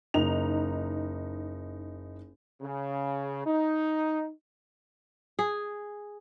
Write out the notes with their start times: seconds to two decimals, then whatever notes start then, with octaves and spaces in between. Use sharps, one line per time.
0.14 F#1 D#4 F7
2.62 C#3
3.46 D#4
5.39 G#4